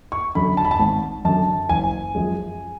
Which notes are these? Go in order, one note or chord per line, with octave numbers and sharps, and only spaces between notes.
C#6
F#2 D3 B5
A5
B5
A5
G#1
F#2 D3 A5
F#1 G#5
F#2 F3 G#3